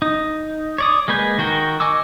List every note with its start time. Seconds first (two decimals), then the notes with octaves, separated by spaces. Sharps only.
0.02 D#4
0.78 C#5 D5 D#6
1.08 G#3 A#3 B4 G#5 G6
1.38 D#3 F#4 A#4 G5
1.80 D#5 G#5 C#6 D6 E6